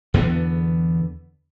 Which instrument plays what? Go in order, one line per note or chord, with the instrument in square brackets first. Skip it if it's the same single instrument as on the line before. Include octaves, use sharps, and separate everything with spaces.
[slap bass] E2 D3 B3